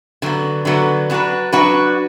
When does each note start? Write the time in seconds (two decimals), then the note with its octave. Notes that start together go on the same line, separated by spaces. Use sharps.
0.22 D3 F#3 B3
0.65 D3 F#3 B3
1.10 F#3 D4 F#4 B4
1.52 F#3 D4 F#4 B4